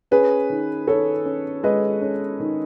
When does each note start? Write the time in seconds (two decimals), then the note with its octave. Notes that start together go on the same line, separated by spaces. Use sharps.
0.11 C#4 G#4 B4
0.50 D#3
0.88 D#3 A4 C#5
1.26 C#4
1.63 G#3 B4 D#5
2.02 C#4
2.40 D#3